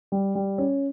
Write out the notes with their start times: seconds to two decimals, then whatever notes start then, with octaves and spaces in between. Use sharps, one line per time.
0.12 G3
0.35 G3
0.58 C#4